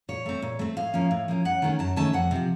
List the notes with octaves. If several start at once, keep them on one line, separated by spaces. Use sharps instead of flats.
A#2 C#5
A3 C4
A#2
A3 C4
A2 F5
F3 A#3 C#4
A2
F3 A#3 C#4
F#2 F#5
D#3 A3 C#4
F#2 A5
D#3 A3 C#4 A5
F2 F#5
C3 F3